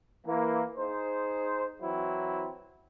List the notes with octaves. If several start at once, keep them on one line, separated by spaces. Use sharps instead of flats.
E3 A#3
D#4 G#4 C5
E3 F#3 C4 E4